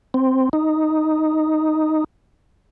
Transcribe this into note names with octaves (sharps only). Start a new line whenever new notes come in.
C4
D#4